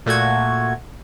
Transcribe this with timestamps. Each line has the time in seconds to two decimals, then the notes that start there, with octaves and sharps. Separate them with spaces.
0.06 A#2 A3 F#4 G#6